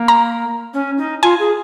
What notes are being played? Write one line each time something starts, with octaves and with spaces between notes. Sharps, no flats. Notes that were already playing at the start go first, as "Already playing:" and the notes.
Already playing: A#3
A#5
C#4
D#4
F4 G#5
G#4